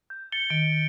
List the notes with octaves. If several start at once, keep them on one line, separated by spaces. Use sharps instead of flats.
G6
A6 C#7 G7
D#3 D7